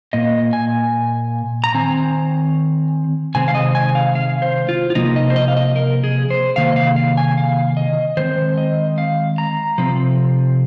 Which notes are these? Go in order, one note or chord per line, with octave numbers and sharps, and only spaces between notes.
A#2 A#3 D#5
G#5
A#5
D#3 C4 G#5
C3 D#3 G#3 C4 G#5
F5
D#5
G#5
F5
F5
C5
F4
F4
C3 F3 A#3 D#4
D#5
C5
D#5
F5
D#5
A#4
G#4
C5
C3 D#3 A#3 F5
D#5
F5
F5
G#5
F5
D#5
D#3 G#3 C4 C5
D#5
F5
A#5
C3 F3 C4